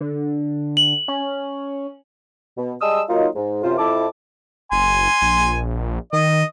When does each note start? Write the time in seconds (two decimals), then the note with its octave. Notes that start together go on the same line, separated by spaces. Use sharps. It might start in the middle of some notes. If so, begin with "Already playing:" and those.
0.01 D3
0.77 F#7
1.08 C#4
2.58 B2
2.81 G3 G#3 A5 D#6 E6
3.09 F#3 A#3 D#4 F4
3.36 G#2
3.64 F#2 C3 F4 C5
3.78 F2 E4 A5 D6
4.72 F#1 G#5 C6
5.22 A#1
6.13 D#3 D#5